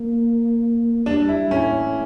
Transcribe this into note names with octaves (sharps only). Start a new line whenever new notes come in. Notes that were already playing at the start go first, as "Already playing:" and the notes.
Already playing: A#3
G3 D4
E4
A2 C#4